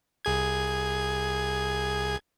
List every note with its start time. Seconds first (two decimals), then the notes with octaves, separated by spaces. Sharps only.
0.25 C2 G#4 G#6